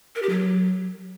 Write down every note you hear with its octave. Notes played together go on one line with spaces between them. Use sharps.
A#4
G4
F#3